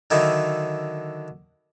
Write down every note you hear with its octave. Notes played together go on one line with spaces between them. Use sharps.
D3 D#3 F#3 D#4 E4